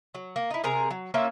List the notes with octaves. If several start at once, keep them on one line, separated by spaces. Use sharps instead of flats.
F#3
A#3
D#4 E4
C3 G#4 A#4 A#5
F#3
A#3 C#4 F4 E5